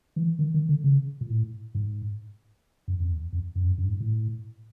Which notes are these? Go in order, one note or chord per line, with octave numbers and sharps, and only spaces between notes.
E3
D#3
D#3
D3
C#3
A#2
A2
G#2
F#2
F2
E2
F2
F#2
F2
F#2
F#2
G2
G#2
A2